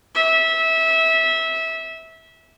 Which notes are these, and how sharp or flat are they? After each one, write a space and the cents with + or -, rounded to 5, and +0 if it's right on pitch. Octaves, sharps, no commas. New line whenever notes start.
E5 -20